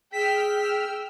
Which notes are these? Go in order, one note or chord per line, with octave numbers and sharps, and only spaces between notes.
G#4 G5 E6 F6 B6
G5 E6 F6